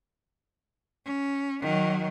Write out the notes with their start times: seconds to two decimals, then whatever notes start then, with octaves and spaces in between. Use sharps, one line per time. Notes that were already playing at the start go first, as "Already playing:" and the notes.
1.06 C#4
1.62 D#3 F#3